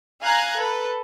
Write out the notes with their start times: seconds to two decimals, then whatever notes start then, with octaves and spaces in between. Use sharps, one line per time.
0.22 F5 G#5 A#5 F#6 G#6
0.56 A4 B4